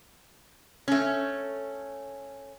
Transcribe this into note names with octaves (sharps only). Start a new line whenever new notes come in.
A3 C#4